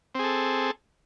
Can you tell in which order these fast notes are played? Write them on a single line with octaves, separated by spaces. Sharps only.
C4 G#4 A4